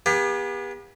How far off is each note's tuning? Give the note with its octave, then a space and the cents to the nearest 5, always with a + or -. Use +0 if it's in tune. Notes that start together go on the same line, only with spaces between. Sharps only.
B3 -40 G4 +40